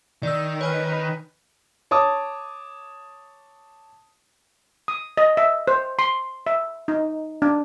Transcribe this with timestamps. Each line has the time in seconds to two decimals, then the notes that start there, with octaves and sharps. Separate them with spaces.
0.23 D#3 D5 E6
0.61 B4 C#5 G#5 F6
1.91 C#5 A5 D6 D#6
4.88 D#6
5.17 D#5
5.37 E5
5.68 C5
5.99 C6
6.47 E5
6.88 D#4
7.42 D4